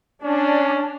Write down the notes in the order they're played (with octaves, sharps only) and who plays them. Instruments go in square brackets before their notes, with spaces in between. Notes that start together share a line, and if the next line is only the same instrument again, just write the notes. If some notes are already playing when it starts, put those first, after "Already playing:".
[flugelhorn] C#4 [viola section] D4